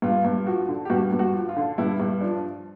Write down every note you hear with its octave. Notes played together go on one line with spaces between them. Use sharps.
G2 F4
G2
F3 F#4
D3
G4
G2 F#4
G2
F#4
F3
F4
D3
G2 E4
G2
F3 D4